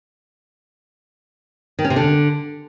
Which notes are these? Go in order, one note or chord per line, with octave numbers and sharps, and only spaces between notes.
D#3
C#4
C3
D3